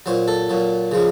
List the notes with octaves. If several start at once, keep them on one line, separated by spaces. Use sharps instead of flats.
A#2 F#3 C5
A4
A#2 F#3
C#3 F3 G#3